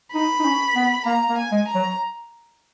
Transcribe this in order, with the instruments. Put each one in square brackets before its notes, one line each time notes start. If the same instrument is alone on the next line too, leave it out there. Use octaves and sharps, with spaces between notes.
[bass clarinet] D#4 [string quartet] B5
[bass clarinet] D#4
C#4
B3
[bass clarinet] A#3 [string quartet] A#5
[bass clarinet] A#3
[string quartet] G#5
[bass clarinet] G#3
[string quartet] A#5
[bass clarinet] F#3